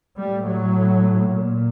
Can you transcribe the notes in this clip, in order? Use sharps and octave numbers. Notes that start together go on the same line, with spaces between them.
A2 G3
F#3
A#2